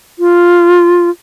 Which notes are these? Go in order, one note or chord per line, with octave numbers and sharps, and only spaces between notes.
F4